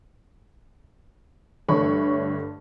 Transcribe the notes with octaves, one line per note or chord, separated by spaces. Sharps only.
G2 D3 A3 C#5 B5 C#6